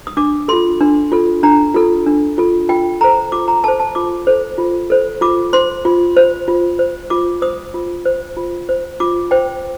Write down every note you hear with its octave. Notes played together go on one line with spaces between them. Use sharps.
D#6
D4 D6
F4 A4 C6
D4
F4 A4
D4 A#5
F4 A4
D4
F4 A4
F4 G5
A4 C5 A#5
F4 D6
A#5
A4 C5 A5
A5
F4 D6
A4 C5
F4
A4 C5
F4 D6
C5 C6
F4
C5
F4
C5
F4 D6
C5 D#6
F4
C5
F4
C5
F4 D6
C5 G5